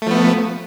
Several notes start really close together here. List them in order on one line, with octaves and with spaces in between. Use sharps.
A3 F3 B3